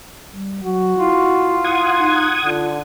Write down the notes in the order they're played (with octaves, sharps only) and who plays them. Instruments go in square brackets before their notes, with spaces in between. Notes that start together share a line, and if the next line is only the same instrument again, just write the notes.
[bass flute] G3
[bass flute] F#3 [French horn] F#4
[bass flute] E4 [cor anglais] F4
[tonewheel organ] F#5 D#6 G#6
[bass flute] D#4
[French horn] D3 [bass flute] F4